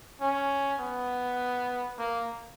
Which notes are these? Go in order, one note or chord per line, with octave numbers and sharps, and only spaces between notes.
C#4
B3
A#3